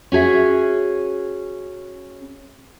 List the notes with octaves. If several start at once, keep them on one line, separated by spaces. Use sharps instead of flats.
C#4 F#4 G#4 E5